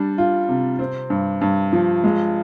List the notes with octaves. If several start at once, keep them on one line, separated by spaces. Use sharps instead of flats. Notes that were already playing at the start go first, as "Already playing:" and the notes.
Already playing: G3 D4
F4
C3
C4
G2
G2
F3
G#3